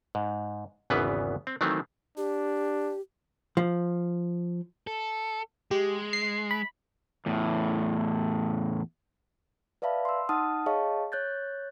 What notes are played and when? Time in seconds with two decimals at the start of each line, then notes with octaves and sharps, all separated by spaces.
0.15 G#2
0.90 G#1 E2 C#3 E3 B3 B4
1.47 C4
1.61 D#3 E3 F#3 A3 C4
2.17 D4 G4
3.57 F3
4.87 A4
5.71 G#3 G4
6.13 C7
6.51 B5
7.26 E2 A2
9.82 B4 D5 E5 F5 A5 B5
10.05 C6 E6
10.29 D#4 F#5 A5 D#6 F6
10.66 G#4 C#5 D#5 F5 A5 C#6
11.12 C#5 F#6 G6 A6